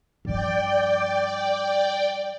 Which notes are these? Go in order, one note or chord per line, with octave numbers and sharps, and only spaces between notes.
G2 F3 D5 G5